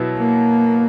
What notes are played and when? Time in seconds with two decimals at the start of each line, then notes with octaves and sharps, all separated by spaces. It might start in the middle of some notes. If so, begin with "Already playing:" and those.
Already playing: B2 F#3 B3 E4
0.18 A#3